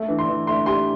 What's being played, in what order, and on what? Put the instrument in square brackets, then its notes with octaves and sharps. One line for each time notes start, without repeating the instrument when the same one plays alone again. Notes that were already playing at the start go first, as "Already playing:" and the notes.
Already playing: [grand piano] A3
E3
[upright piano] C6
[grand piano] E3
[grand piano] A3 [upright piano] C6
[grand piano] G4 [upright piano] C6